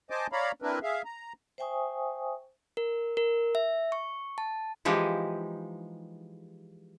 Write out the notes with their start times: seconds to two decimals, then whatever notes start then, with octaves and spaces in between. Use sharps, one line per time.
0.10 C5 D#5 G#5 A5 D6
0.32 C#5 D5 F5 A#5 B5
0.62 C4 D4 E4 A#4 B4
0.83 G#4 E5 F5
1.05 A#5
1.58 C5 E5 G5 G#5 C#6 D#6
2.77 A#4
3.17 A#4
3.55 E5
3.92 C#6
4.38 A5
4.85 E3 F3 G#3 D#4 G4